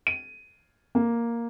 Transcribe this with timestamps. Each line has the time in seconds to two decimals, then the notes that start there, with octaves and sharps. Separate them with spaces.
0.07 D#7
0.95 A#3